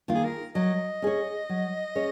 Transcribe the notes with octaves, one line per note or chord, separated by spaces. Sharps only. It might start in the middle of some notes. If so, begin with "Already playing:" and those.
D#3 A#3 F4
G#4
A#4
F#3 D#5
C#4 G#4 C#5
F#3
C#4 G#4 C#5